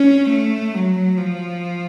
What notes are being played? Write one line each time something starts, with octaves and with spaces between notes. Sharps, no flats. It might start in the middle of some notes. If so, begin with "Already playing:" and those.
Already playing: C#4
A3
F#3
F3